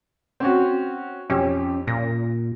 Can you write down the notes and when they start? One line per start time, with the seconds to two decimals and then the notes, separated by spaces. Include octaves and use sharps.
0.40 C4 C#4 F#4
1.30 F2 C#4 G4 E6
1.87 A#2 A#6